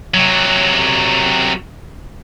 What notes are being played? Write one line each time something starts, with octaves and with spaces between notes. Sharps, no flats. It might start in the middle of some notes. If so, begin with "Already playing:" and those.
C3 F#3